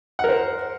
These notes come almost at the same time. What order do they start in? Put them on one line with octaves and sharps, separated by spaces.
F#5 A#4 C5